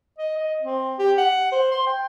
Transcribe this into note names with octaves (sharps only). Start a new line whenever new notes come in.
D#5
D#5
C4
G4
F#5
C5
C6
G5